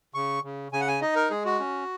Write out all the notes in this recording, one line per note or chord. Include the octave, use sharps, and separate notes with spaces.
C#3 C#6
C#3
C#3 G#5
F#5
G#5
D#4 D#5
A#4
G#3 G#4
F#4
C#4